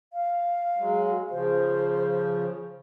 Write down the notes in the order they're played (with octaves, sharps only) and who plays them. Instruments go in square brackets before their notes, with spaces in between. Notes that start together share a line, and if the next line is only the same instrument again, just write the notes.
[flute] F5
[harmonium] F#3 G#3
[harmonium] C#3 F3 [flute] C5